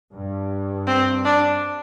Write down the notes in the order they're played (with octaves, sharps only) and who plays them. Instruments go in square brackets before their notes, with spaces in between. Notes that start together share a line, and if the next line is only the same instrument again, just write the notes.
[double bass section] G2
[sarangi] C4
D4